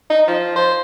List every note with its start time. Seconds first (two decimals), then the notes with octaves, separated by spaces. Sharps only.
0.10 D#4
0.27 F3
0.56 C5